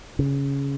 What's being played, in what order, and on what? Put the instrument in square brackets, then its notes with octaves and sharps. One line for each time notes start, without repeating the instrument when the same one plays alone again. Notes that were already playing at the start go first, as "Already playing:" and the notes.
[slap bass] C#3